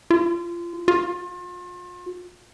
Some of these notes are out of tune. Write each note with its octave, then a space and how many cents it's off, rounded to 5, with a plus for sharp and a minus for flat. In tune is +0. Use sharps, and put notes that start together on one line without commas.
F4 -25
F4 +35